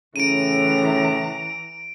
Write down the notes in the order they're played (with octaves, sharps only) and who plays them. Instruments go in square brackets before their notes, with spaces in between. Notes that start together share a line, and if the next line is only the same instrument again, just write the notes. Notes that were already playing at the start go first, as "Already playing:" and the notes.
[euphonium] A2 [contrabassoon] C#3 [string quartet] E3 A#5 [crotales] D7 D#7